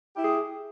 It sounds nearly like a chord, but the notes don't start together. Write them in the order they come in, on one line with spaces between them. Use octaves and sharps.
G4 E4 G#4